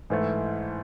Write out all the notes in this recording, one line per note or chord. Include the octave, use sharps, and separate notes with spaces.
G#2 E3 A3